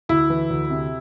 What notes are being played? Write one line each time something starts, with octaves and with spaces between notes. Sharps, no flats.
D2 E4
E3
D2
C3